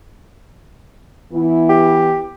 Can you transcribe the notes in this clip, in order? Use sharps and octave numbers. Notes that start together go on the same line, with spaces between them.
E3 B3 E4
G4